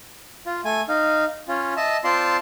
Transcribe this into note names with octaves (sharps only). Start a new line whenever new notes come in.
F4
A3 G#5
D#4 F5
C#4 F4
D#5 E5 A5
C4 F4 D5 A5 C6